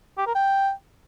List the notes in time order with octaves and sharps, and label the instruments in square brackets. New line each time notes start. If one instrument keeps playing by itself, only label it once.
[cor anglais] G4
A#4
G5